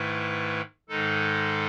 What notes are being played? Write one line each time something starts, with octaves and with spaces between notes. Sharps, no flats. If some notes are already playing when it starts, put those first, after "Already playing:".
Already playing: G#2 D#3 A3 E4 B4
G#2 D#3 G#3 D#4 A4